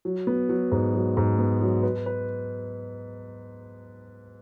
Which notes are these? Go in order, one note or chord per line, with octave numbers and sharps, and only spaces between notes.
F#3
B3
F#3
G#2
F#3
G#2
B3
F#3
B4
B4